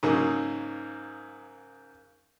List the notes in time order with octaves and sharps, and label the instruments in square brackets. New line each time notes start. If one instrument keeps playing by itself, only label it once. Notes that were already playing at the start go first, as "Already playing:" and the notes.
[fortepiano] G#2 C#3 F#3 A#3 D#4